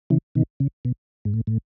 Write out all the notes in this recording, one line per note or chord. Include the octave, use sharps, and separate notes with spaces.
C#3 E3
B2 D#3
C#3
B2
G#2
A2
A2